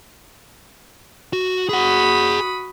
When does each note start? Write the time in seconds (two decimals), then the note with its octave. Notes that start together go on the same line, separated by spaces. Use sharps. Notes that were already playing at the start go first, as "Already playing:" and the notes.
1.33 F#4
1.69 F#4 G#4 F#5 B5 D#6